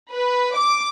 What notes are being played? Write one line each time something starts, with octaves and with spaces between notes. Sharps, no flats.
B4
D6